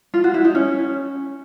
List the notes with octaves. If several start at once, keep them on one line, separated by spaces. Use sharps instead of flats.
F4
F#4
E4
D#4
C#4